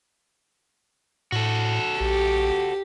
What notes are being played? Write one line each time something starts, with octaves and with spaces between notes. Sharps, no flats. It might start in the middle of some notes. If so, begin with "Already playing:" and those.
A2 F#4 A4
A#1 G4